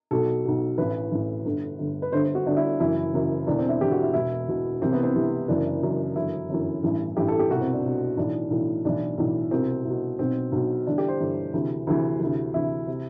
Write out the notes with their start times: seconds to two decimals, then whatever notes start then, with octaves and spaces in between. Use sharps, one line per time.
0.11 B1 B2 A4
0.45 B1 B2
0.78 A1 A2 E3 B4
1.11 A1 A2 E3
1.45 G1 G2 D3
1.79 G1 G2 D3
2.02 B4
2.12 G1 G2 D3 C5
2.24 C5
2.35 F#4
2.46 G1 G2 D3 D4
2.57 E4
2.80 F#1 F#2 E3 E4
3.13 F#1 F#2 E3
3.47 E1 E2 D3 D4
3.59 C4
3.69 E4
3.80 E1 E2 D3 G4
3.92 F#4
4.03 E4
4.14 E1 E2 B2 E4
4.48 E1 E2 B2
4.81 C2 C3 E3 C4
4.93 B3
5.03 C4
5.15 C2 C3 E3
5.48 F#1 F#2 E3 D4
5.82 F#1 F#2 E3
6.16 G1 F#2 E3 E4
6.49 G1 F#2 E3
6.83 A1 G2 E3
7.17 A1 G2 E3 G4
7.28 A4
7.39 G4
7.50 C2 B2 F#4
7.61 C4
7.73 D4
7.84 C2 B2
8.17 B1 A2 E3 D4
8.50 B1 A2 E3
8.85 B1 A2 E3 D4
9.18 B1 A2 E3
9.51 C2 B2 C4
9.85 C2 B2
10.19 B1 B2 C4
10.52 B1 B2
10.87 G1 G2 E3 D4
10.98 G4
11.08 C5
11.20 G1 G2 E3
11.53 D2 C3 E3
11.87 D2 C3 E3
12.20 D2 C3 E3
12.54 D2 C3 E3 E4
12.87 C3